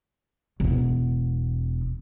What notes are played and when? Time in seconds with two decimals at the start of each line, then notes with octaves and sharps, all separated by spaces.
0.60 E1 B3